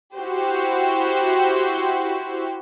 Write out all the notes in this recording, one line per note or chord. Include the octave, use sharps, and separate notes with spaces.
E4 F#4 G4 C5